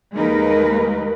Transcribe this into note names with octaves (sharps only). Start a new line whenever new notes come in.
D#2 G#3 A#3 D#4 A#4 B4